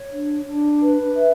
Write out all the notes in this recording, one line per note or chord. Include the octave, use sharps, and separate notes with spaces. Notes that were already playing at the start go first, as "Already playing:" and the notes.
Already playing: C#5
D4
D4
B4
E5